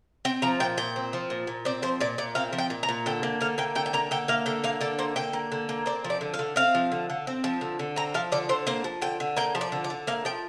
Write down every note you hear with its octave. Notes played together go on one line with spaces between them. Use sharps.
C4 G5
F3 A#5
A#2 G5
A#2 G5
C4
F3
A#2
A#2
C4 D5
F3 C5
A#2 D5
A#2 D5
C4 F5
F3
G5
A#2
A#5
A#2
D3 G5
A#3
D3 F5
A#3 G5
D3 G5
G5
A#3 A#5
D3 G5
A#3 F5
D3 G5
A#3 F5
D3 D5
A#3 C5
D3 G5
A#3
D3
A#3
C4 D5
F3
D5
D3
F5
D3
C4 F5
F3
D3
D3
C4
F3
D3
D3
C4 A#5
F3 F5
D3 D5
D3 C5
A#3 C5
F3
D3 G5
D3
A#3 G5
F3
D5
D3
D5
D3
A#3 F5
F3 G5